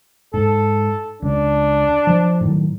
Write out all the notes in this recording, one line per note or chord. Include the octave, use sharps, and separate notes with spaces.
G#2 A4
C#2 D4
F3
A2 D#3 F#3